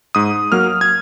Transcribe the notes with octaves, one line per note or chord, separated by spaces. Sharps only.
G#2 D#6
F#3 A#3 F6
G#6